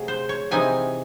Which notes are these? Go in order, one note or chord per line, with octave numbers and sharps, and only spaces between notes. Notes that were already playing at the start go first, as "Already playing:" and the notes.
Already playing: C3 F#3 A3 G#4
C5
C#5
C3 E3 C4 D#4 G#5